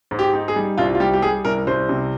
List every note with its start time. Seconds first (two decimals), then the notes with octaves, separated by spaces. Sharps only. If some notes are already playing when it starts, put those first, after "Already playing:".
0.11 G#2
0.19 G4
0.33 D#4
0.48 G#4
0.56 G3
0.78 C2 F4
0.95 F4
1.00 G3 G4
1.14 G4
1.22 G3 G#4
1.45 C2 A#4
1.67 C2 C5
1.89 C3